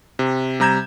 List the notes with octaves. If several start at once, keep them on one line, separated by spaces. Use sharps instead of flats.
C3
C3 G3 A#5 G6 G#6 E7